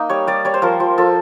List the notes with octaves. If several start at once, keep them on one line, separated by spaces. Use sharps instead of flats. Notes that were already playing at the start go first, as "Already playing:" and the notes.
Already playing: A#3 D#4
G3 C#5
G3 D5
G3 C#5
C5
F3 A#4
F3
F3 A4